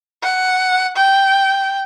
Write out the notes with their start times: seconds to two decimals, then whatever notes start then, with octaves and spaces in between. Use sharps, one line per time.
0.23 F#5
0.96 G5